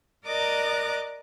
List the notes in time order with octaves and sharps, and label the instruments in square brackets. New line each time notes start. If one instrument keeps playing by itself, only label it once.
[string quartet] A#4 D5 D#5 A#5 D6 F#6